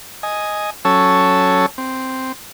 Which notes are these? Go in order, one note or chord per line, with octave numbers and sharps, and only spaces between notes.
D#5 G#5
F#3 C#4 A4 C#5 A5 E6
C4